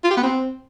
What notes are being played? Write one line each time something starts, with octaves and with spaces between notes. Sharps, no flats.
F4
G4
B3
C4